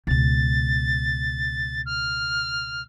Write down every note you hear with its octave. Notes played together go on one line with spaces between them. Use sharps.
C#2 B2 A6
F6